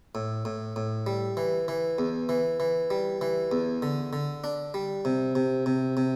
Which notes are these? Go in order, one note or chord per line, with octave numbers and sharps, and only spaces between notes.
A2
A2
A2
G3
E3
E3
E2
E3
E3
G3
E3
E2
D3
D3
D4
G3
C3
C3
C3
C3